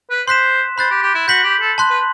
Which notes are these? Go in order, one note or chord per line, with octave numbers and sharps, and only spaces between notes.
B4
C5 C6 F#6 B6 E7
C5 B5 F#6 A6
G4
G4
E4
F#4 G6 B6 F#7
G4
A4
A5 C6 F#6
B4